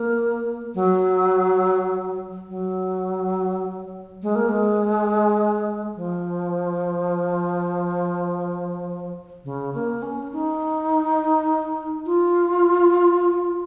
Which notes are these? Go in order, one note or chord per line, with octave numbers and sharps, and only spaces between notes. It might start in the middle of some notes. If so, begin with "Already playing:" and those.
Already playing: A#3
F#3
F#3
G#3
A#3
G#3
F3
C#3
A#3
C#4
D#4
F4